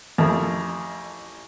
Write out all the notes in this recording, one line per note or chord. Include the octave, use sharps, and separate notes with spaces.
A1 F2 E4 A4 A#4